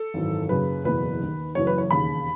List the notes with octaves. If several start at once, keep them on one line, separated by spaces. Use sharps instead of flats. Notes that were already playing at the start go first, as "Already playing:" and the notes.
Already playing: A4
G#1 F#2 E3
F#1 F#2 C#3 B4
F#1 E2 B2 B4
D#2 D#3
F#1 F#2 E3 C#5
B4
C#5
E1 D#2 C#3 B5